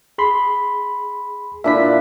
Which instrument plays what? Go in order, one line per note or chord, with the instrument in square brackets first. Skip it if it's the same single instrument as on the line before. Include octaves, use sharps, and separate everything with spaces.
[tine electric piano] G#4 B5 C6
[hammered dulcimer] A#2 D4 E4 [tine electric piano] E5 B6